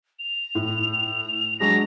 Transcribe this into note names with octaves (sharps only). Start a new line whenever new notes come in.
F7
A2
F#3 G#3 D4 A#6